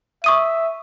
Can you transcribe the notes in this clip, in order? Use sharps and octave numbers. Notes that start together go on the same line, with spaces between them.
E5 C#6 D#6 D#7